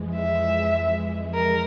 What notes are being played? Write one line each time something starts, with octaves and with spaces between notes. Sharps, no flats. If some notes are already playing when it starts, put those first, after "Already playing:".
Already playing: F2 E3 G#3
E5
A#4